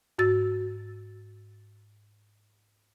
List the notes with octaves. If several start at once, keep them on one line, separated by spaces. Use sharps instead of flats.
G#2 F#4 E6 A6